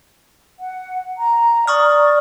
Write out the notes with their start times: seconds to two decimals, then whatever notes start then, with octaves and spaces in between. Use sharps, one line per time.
0.59 F#5
1.18 A#5
1.67 D5 C#6 D#6 F6